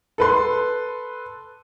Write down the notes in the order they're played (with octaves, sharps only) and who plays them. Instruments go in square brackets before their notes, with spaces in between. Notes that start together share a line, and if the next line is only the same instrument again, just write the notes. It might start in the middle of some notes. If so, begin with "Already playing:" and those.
[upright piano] A4 B4 C6